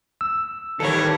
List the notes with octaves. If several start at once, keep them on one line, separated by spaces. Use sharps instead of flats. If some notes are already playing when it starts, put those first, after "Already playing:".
E6
D#3 E3 G3 A#3 G4 A4 C#5